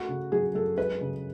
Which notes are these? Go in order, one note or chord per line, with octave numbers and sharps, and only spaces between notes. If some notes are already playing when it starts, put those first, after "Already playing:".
Already playing: A3 F#4
C#3
F#3 G#4
F#2 A4
G#3 B4
C#3